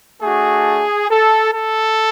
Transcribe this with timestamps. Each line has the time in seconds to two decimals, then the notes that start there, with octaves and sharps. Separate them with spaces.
0.21 A3 D4 F#4 G#4
1.09 A4
1.52 A4